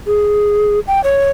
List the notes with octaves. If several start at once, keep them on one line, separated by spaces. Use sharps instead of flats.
G#4
G5
C#5